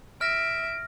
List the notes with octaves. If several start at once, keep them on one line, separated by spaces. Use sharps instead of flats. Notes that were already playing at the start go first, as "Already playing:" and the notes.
E5 F6 A#6 D7